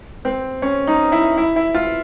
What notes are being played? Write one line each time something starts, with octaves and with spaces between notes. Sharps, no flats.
C4
C#4
D#4
E4
E4
E4
F4